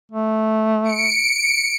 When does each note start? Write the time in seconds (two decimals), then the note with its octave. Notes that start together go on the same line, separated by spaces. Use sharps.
0.12 A3
0.84 C#7 D7